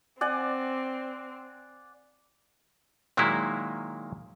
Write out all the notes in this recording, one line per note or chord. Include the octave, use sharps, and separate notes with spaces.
C4 D5 F#5 G#5
A#2 D#3 F#3 G#3 A#3 E4